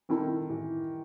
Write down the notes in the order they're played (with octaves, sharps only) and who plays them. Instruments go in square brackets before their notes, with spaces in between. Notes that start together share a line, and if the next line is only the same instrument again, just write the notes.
[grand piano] D#3 [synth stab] E3 C4 E4 A4
[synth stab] A2 [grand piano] E3